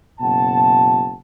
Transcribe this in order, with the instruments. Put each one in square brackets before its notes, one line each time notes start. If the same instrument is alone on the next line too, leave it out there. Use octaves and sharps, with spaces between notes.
[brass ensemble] F#1 B2 F#5 A5